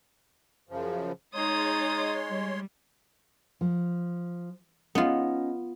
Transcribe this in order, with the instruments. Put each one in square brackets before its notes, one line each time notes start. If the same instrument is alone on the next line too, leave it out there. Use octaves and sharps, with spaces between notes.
[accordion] F#2 C#3 F3
[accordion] G#3 C#5 C6 [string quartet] D#4 D#6 A6
[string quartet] G3
[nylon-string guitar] F3
[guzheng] B3 F4 [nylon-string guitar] C#4 D#4